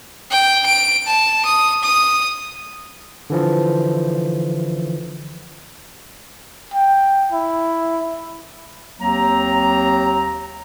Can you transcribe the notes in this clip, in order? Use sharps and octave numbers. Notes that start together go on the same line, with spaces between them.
G5
D7
A5
D#6
D#6
D3 E3 F3
G5
E4
D#2 F#3 A#3 C4 A#5